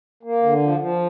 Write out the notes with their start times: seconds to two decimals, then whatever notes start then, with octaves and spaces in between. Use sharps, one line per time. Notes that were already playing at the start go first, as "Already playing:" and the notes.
0.23 A#3
0.43 D3
0.61 F3
0.80 F3